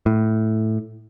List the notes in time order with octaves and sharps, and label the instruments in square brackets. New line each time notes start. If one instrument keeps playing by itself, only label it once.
[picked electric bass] A2